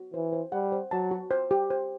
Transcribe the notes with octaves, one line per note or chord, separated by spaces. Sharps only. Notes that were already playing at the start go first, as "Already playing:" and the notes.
Already playing: F#4
E3 C5
C5
G3 F#5
C5
F#3 A5
F#4
C5
G4
C5